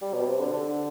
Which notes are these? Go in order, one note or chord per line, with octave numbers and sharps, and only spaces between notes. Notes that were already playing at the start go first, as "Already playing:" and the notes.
G3
B2
C3
D3
D3